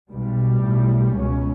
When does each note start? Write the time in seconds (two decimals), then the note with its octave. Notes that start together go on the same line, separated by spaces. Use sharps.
0.11 B1 B2 G3
0.62 B1 A2
1.12 C#2 B2 C#4